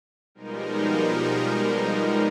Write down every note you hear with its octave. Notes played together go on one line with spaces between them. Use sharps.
B2 F3 G3 G#3 D#4 A#4